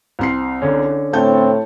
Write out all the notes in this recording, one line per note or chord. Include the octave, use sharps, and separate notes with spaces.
C2 C4 C7
D3 C#4
A2 C4 C#5 A5 G6